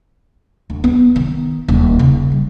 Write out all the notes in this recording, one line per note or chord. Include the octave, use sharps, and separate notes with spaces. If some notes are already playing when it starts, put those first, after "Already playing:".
D2
B3
D#3
D#1
C#3
G3